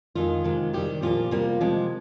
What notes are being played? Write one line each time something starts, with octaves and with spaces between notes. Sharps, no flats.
F2 D#3 G#3 F4
C3 D#3 G#3
C3 D#3 G3 G4
A#2 F3 A#3 F4
C3 G3 A#3
C3 F3 G#3